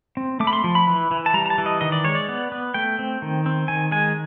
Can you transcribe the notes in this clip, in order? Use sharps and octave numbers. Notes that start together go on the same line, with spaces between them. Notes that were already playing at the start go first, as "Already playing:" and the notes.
C4
A3 D6
B5
C6
F3
B5
E3
E3
A5
G3 A#5
A#5
A5
E3
D#5
D#3 D#5
D5
G#3 C#5
D5
B3
B3
A3 G5
C4
D#3
C4
D#3 G#5
G#3 G#5